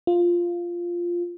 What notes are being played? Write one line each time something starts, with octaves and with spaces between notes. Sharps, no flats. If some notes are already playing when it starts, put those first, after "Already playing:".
F4